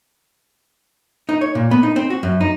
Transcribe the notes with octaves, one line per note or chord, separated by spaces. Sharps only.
D#4
C#5
A#2
B3
D#4
C4
F#4
F#2
D#4